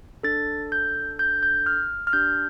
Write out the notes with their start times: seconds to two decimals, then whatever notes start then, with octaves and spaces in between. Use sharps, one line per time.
0.23 D4 A4 A6
0.72 G6
1.19 G6
1.43 G6
1.66 F6
2.07 F6
2.13 D4 G4 G6